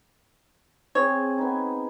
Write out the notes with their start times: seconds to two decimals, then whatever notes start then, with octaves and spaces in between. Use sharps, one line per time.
0.95 C4 G#4 C#5
1.38 B3 D#4